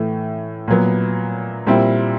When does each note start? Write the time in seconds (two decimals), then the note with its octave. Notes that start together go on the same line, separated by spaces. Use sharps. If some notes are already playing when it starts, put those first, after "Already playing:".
Already playing: A2 E3 A3
0.68 A#2 F#3 B3
1.67 A#2 G3 C4 E4